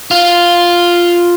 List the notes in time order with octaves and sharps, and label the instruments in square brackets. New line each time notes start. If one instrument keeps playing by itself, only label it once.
[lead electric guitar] F4